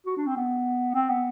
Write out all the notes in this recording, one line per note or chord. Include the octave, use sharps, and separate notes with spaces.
F#4
D4
C4
B3
C4
B3